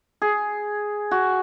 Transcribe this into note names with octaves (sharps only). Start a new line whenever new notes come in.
G#4
F#4